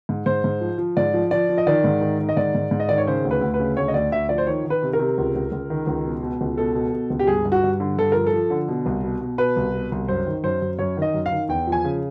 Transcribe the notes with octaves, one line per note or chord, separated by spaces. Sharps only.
G#2
G#2 C5
G#2
F3
F3
G#2 D5
F3
F3 D5
F3
D#5
D#3 D5
G#2
D#3
D#3
D#5
G#2 D5
G#2
G#2
D#5
D#3 D5
C#5
C#3 C5
D2
B4
D2
B4
C#3
D2 C#5
D#5
D2 D5
D2 E5
F3 D5
C5
D#3 C#5
D#3
B4
C3
A#4
C3
C#2
C#2
C#2
D#3
C#2
B2
B2
C#2
B2 A4
B2
B2
C#2
G4
G2 G#4
G2
F#4
G2
D3
G2 A4
F3 A#4
A4
F3
D3
B2
C2
B2
B2
B2 B4
C2
B2
C2
F#2 C5
D#3
F#2 C5
F#2
F#2 C#5
D#3 D#5
F#2
F5
D#3
E2 G5
F3
G#5
C#3